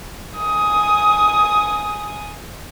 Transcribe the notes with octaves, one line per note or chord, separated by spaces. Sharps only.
G#5 D#6